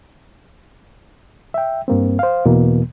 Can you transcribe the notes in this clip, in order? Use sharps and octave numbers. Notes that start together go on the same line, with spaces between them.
E5 G5
G2 A#3 C4
C5 F5
E2 B2 E3 A#3